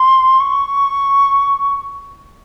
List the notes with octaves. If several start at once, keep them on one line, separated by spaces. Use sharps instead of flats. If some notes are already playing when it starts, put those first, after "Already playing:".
Already playing: C6
C#6